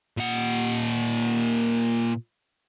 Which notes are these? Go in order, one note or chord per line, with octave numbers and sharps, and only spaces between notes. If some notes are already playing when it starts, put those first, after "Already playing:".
A#2 F#5